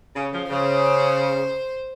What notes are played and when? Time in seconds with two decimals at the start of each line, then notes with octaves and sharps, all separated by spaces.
0.16 C#3
0.33 C#3 F3
0.49 C#3 C5